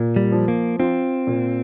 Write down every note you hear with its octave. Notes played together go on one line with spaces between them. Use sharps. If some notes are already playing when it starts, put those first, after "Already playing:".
Already playing: A#2
G3
F3
A#3
C4 F4
A#2